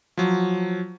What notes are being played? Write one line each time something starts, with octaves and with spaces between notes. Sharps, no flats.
F3 F#3